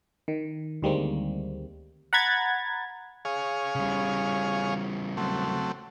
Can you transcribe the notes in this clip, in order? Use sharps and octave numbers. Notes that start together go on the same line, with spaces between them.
D#3
D2 D#3 G3 G#3 A#3 C4
F#5 A#5 B5 G#6 A6
G#4 C#5 F5
C#3 G3
F#3 A3 C4